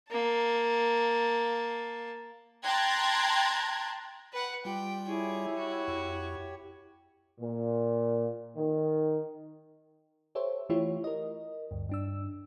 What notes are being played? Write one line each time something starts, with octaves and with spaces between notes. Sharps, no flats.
A#3 A5
G5 A5 A#5 C6 F#6 G#6
B4 F#5
G3 F4 G4 G5
E4 G4 G#4 C#5
F#4
F2
A#2
D#3
G4 A4 C5 C#5 E5
E3 A3 E4 F4 G4 C#5
A#4 D#5
D2 G2
G2 D4 E6